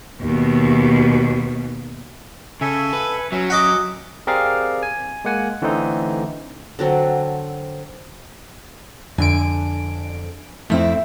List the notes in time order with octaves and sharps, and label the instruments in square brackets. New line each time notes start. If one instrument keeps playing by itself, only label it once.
[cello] D#2 B2
[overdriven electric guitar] C#3 [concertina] A4 E5 G#5
[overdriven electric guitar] B4
[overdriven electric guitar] F#3 [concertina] C#4 E5
[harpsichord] F#4 D#5 D6
[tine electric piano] C4 G4 G#4 A#4 D5 F5
G#5
G#3 A#3 F#5 G#5
D3 E3 A3 C4 D#4
[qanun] D3 F#3 C4
[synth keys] F2 D3 D7 [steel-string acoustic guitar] G#5
[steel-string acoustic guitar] F2 E4 [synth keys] A3 C4